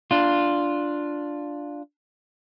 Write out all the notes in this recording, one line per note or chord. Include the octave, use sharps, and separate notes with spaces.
D4 F4